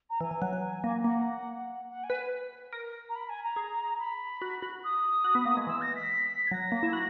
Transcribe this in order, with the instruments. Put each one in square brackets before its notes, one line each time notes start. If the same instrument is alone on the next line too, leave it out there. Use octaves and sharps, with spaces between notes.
[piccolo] A#5
[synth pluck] E3 [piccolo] G#5
[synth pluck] E3
F#3
F#3
A#3
[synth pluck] A#3 [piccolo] F#5
[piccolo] F#5
G#5
[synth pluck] B4
A#4
[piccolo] A#5
B5
G#5
A#5
[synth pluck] G#4
[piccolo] B5
[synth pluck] F#4
F#4
[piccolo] D#6
[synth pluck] F#4
B3
A#3
G#3
[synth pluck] E3 [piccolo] E6
[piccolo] A#6
B6
G#6
[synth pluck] F#3 [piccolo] A#6
[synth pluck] A#3
E4
F#4